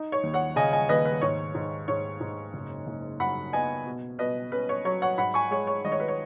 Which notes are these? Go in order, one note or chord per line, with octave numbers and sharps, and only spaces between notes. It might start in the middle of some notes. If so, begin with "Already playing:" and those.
Already playing: D#4
C#5
D#2
C#5 F#5
C#3 D#5 G#5
D#5 G#5
D#2 B4 D#5
B4
G#2 C#5
G#2
G#2 C#5
G#2
F#1
F#1
F#2 F#5 B5
B3 D#5 G#5
B2
B2 B4 D#5
C#4 B4
C#5
F#3 C#5
C#5 F#5
G#2 F#5 B5
G#5 C#6
G#3 C#5
C#5
G#1 D#5
C#5
B4
C#5